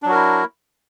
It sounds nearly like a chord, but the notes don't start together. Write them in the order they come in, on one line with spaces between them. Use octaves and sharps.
D4 F#3 F#4 A#4 E4